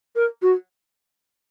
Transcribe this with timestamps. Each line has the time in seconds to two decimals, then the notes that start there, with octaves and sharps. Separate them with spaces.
0.15 A#4
0.42 F#4